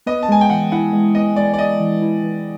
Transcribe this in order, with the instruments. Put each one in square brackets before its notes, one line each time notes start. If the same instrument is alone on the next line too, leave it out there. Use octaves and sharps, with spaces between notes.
[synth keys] B3 [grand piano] D#5
[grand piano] A5
[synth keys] G#3 [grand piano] G#5
[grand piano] G5
[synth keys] E3 [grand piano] F#5
[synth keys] E4 [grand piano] F#5
[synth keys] G#3
[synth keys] B3 [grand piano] D#5
[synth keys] G#3 [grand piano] D5
[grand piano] D5
[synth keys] B3 [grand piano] D#5
[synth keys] E3
E4
E3